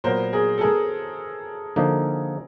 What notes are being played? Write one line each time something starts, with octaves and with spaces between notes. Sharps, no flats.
A#2 F#3 B3 A#4 C5
G#4 A#4
A4
G#4 A#4
D3 F3 A#3 D#4